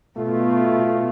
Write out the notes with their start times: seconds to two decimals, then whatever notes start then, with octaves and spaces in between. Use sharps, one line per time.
0.17 B2 A3 F4